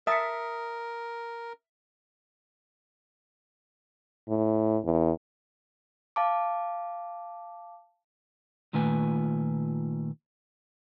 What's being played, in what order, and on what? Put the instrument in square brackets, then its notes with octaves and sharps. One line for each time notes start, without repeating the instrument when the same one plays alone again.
[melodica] A#4 [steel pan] E5 A5 [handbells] D#6 B6 C#7
[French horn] A2
E2
[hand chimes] F5 A5 D6
[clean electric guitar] A#2 D#3 A3 F4 B4 G#5